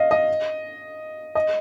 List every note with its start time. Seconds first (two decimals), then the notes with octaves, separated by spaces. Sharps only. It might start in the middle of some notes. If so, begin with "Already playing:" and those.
Already playing: D#5 F5
0.11 D#5
1.35 D#5